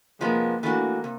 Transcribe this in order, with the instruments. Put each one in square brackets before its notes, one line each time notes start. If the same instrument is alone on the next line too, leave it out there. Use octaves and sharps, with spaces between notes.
[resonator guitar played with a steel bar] C3 F3 G#3 B3 [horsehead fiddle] A#3
[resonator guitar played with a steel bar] E3 A3 D4 F#4 [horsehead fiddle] A#3
[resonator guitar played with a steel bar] C3